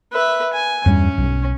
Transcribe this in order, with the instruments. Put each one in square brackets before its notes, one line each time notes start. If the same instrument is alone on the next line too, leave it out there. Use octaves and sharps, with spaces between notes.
[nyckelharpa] B4 E5
G#5
[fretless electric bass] E2 G2 G3 [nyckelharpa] C#4
[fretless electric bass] B1